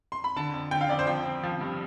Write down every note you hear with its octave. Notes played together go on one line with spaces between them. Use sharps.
C6
B5
D3 A5
F2
D3 G5
F5
F2 D5
C5
F3 G5
C4
F3
G2